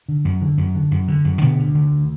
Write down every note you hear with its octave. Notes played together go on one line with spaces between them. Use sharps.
D3
F#2
D3
F#2
D3
F#2
D3
F#2
B2 D3 B3
D2
D3
D2